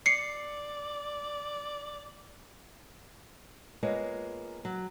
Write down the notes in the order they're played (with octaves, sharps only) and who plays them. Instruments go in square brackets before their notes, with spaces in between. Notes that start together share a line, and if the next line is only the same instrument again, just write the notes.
[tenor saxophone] D5 [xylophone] C7 C#7
[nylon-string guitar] G#3 A#3 B3 F4 C#5
F#3